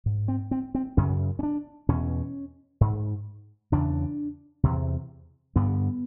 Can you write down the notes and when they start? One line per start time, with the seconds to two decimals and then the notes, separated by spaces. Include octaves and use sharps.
0.06 G#2
0.28 C4
0.51 C4
0.75 C4
0.97 F#2 C#3 C#4
1.39 C#4
1.43 D4
1.89 E2 B2 C#4
2.81 G#2
3.72 E2 C#3 D4
4.63 E2 C3
5.56 G2 D3 B3